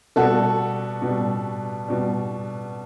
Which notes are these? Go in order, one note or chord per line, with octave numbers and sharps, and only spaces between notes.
B2 G3 F#4 A4
B2 G3
B2 G3